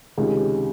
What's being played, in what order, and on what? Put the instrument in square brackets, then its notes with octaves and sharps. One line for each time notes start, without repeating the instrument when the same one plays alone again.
[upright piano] C#2 C3 D#3 G#3 C#4